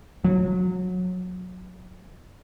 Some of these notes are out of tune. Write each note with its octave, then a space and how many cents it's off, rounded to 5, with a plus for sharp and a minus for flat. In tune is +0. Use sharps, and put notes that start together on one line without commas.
F#3 -20